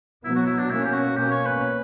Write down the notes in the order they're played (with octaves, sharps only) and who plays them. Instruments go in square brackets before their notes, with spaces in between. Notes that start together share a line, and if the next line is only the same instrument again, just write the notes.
[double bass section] B2 F#3 B3 [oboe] E4
[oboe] F#4
E4
D4
[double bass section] B2 A#3 C#4 [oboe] E4
[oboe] G4
F#4
[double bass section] B2 A#3 C#4 [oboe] G4
[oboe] C#5
B4